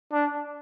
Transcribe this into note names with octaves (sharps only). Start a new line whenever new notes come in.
D4